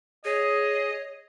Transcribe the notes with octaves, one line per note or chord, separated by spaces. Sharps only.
G#4 C#5 D#5